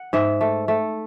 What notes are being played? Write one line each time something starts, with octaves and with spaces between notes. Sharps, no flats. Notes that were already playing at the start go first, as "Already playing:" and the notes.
Already playing: F#5
G#2 E5
A3
A3